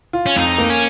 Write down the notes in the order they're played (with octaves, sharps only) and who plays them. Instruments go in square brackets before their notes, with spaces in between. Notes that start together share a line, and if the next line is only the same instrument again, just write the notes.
[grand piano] F4
[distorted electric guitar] C#4
[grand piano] F2 [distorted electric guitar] D#4
[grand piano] A#3
[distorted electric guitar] C#4